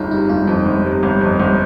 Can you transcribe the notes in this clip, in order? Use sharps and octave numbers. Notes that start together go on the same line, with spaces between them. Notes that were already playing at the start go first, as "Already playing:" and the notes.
Already playing: G1 D#4 F4 G4 G#4
C3 D#4
G1 F4
F2 D#4
G1
C3
G1
F2
G1